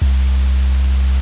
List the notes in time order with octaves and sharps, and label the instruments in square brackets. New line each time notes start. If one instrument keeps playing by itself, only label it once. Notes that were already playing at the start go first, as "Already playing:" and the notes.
[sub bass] C2